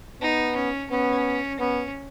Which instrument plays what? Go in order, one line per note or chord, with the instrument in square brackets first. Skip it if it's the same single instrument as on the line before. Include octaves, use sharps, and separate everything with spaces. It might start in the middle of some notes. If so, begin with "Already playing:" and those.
[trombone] B3 [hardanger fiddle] D#4
[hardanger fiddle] C#4
[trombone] B3 [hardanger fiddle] C#4
[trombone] B3 [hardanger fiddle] C#4